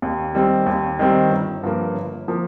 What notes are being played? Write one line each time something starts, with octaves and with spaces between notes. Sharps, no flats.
D#2
D#3 G3 C4
D#2
D#3 G3 C4
G1
G2 F3 A#3
G1
F3 A#3